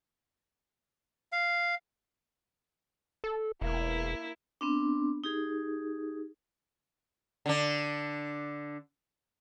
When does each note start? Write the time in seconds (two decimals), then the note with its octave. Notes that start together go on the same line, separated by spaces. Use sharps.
1.32 F5
3.24 A4
3.62 E1 A#3 E4
4.61 B3 C4 D4
5.24 D#4 G4 G#4
7.46 D3 D4